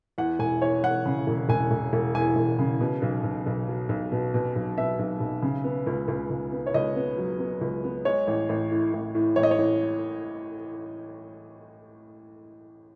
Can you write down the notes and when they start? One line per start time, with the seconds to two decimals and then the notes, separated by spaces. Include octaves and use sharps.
0.18 E2 F#5
0.39 E1 G#5
0.62 E2 C#5
0.83 E2 F#5
1.05 C#3
1.27 E1
1.49 E1 G#5
1.71 E1
1.93 E1
2.14 E2 G#5
2.36 E1
2.59 C#3
2.81 B2
3.02 B1
3.24 B1
3.46 B1
3.68 F#3
3.89 B1
4.12 B2
4.34 B2
4.56 B1
4.78 B2 E5
4.99 B1
5.20 B1
5.42 C#3
5.64 B3
5.87 C#2
6.08 C#2
6.30 C#2
6.52 B3
6.67 C#5
6.74 C#2 D#5
6.96 B3
7.18 F#3
7.39 B3
7.61 C#2
7.84 B3
8.05 G#3 C#5
8.27 A1
8.49 A1
8.71 A2
8.93 A1
9.15 A2
9.36 A1 C#5
9.43 D#5
9.51 C#5
9.58 A1